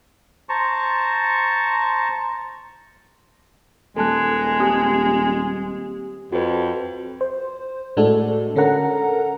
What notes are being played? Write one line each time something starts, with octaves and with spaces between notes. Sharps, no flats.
C5 A5 A#5 C#6
D#1 G#3 A4 A5 F#6
C4 G4 D#6
F2 F#4 B4
C5
A2 G#3 D4 F#4 A4
D3 C#4 A4 A#4 F#5 A#5